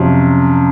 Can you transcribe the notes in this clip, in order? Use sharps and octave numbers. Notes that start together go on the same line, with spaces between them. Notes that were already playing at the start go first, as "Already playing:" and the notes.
Already playing: F2 C3 F#3 C#4